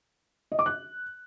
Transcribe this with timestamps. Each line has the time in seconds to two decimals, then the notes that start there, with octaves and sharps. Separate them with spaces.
0.52 D#5
0.59 D6
0.66 F#6